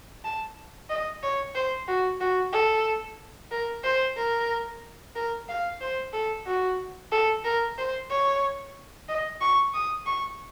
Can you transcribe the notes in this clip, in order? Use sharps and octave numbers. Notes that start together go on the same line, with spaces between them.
A5
D#5
C#5
C5
F#4
F#4
A4
A#4
C5
A#4
A#4
F5
C5
A4
F#4
A4
A#4
C5
C#5
D#5
C#6
D#6
C#6